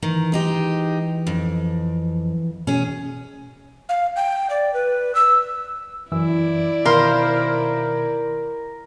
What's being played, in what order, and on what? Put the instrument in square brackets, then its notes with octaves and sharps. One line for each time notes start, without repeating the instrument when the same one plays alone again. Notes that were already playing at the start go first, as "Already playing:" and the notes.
[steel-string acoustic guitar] D#3 [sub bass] E3
[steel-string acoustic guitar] G#3 D#4 G4
F2
[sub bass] B2 [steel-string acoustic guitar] C#4 G#4
[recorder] F5
G5
D5
B4
E6
[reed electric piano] F#2 E3 E6 [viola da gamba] E4 D5
[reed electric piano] B2 D#3 B5 [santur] A#4 [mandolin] C5 F5